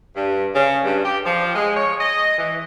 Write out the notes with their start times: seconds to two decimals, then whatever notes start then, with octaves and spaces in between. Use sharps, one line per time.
0.15 G2
0.54 C#3
0.84 G2
1.04 G4
1.24 F3
1.56 G#3
1.77 C#5
1.99 D#5
2.38 E3